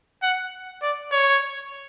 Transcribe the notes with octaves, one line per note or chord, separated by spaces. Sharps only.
F#5
D5
C#5